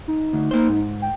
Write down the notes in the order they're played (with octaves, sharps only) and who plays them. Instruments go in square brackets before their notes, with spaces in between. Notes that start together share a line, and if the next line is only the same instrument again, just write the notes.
[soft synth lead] D#4
[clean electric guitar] D2
A#3 C5
G#2
[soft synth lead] G5